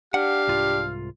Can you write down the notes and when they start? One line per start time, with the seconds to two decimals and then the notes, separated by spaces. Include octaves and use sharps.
0.14 D4 G4 F5 F#5
0.48 C2 G#2 F4